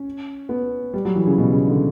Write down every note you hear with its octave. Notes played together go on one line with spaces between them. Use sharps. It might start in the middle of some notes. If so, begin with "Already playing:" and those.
Already playing: C#4
B3
G3
F#3
E3
C#3
B2
C#3
D3